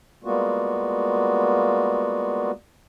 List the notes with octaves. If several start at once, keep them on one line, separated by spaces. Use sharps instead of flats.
G3 G#3 A#3 B3 F4 F#4